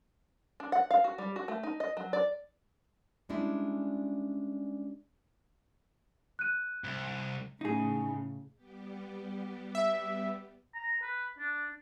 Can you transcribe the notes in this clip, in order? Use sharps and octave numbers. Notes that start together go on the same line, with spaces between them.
D4
F#5
F5
F#4
G3
F#4
A3
D#4
D#5
F#3
D5
G3 G#3 C#4 D4 E4
F#6 D#7
C2
A2 C#3 D#4 G#4
G3 B3 G4
E5
A#5
B4
D4